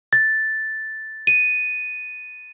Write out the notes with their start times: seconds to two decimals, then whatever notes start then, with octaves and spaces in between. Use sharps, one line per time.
0.13 A6
1.27 D#7